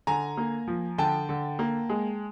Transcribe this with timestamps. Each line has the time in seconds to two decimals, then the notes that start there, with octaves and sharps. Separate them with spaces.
0.07 D3 G#5 A#5
0.37 A#3
0.67 F3
0.98 D3 G5 A5
1.29 D3
1.59 A#3
1.89 G#3